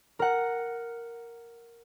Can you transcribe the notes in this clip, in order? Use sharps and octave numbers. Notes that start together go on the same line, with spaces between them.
A#4 F#5